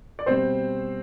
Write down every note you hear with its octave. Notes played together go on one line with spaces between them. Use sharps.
D5
B2 G3 C4 C5